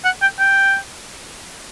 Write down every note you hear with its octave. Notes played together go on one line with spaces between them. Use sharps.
F#5
G5
G5